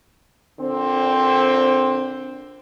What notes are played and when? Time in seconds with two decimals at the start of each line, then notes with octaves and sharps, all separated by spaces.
0.58 A#2 D3 C4